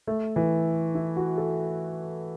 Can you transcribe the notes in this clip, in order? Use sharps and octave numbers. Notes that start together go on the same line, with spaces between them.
A3
E3
E4
F#4
A4